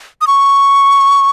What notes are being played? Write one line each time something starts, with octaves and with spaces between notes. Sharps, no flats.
D#6
C#6